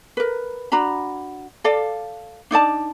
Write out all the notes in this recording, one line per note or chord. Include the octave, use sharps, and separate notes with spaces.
A#4 B4
D4 F#4 A#5 B5
A4 D5 F5
D4 D#4 D5 A5